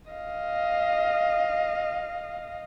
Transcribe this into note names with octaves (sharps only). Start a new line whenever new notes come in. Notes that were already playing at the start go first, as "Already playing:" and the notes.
D#5 F5